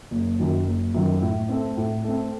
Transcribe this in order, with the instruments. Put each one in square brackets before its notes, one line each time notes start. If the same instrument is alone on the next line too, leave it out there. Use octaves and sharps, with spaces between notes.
[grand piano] F#1
F#2 D#3 F#3
F#1
F#2 D#3 F#3
A2
A3 C4
A2
A3 C4